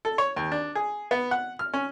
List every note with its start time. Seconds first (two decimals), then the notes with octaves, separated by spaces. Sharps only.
0.05 A4
0.18 C#5
0.36 D#2
0.52 D4
0.75 G#4
1.11 B3
1.31 F#5
1.59 F6
1.74 C#4